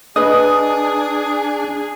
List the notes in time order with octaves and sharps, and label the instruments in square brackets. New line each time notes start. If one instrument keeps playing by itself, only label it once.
[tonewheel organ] D4 [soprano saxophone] G#4 [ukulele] B4 D#5 [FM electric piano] D#6